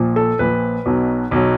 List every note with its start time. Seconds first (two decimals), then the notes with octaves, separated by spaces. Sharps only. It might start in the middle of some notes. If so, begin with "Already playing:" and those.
Already playing: A#1 A#2 F3
0.16 A4
0.39 A#1 A#2 F3 B4
0.86 B1 B2 F#3
1.31 B1 B2 F#3